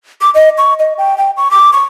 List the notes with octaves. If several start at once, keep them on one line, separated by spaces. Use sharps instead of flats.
D6
D#5
C#6
D#5
G5
G5
C#6
D6
C#6